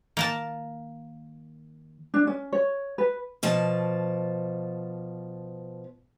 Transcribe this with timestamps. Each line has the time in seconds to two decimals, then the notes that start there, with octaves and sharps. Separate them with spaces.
0.17 D#3 A#3 A#4 A5
2.14 D4
2.27 C#4
2.53 C#5
2.98 B4
3.43 B2 F3 A5